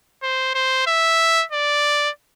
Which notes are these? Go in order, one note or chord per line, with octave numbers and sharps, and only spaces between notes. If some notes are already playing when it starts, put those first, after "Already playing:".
C5
C5
E5
D5